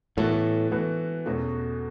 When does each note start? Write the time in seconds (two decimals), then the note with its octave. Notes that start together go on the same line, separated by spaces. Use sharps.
0.17 A2 E3 B3 F#4 A4
0.71 E3 B3 F#4 A4
1.26 E2 B2 A3 C#4 F#4